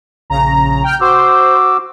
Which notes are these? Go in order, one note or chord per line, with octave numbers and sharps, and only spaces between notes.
A#1 C#3 A#5
G5 F6 G6
F#4 C5 D6 E6